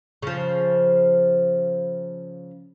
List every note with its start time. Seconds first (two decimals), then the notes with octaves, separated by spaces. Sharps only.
0.22 C#3 F3